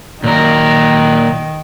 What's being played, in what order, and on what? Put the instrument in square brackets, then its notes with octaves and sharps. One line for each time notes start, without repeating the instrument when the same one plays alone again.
[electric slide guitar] A#2 F#3 A#4 [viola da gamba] D#3